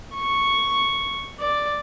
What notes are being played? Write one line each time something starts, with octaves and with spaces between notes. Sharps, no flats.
C#6
D5